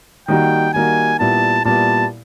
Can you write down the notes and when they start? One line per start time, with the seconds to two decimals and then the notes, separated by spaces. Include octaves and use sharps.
0.28 D#3 G3 A#3 D#4 F#4 G5
0.74 D#3 G3 A#3 D#4 F#4 G#5
1.20 A#2 G3 B3 E4 A5
1.65 A#2 G3 B3 E4 A5